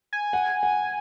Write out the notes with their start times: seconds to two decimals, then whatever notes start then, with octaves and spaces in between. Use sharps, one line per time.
0.13 G#5
0.33 F#5
0.63 F#5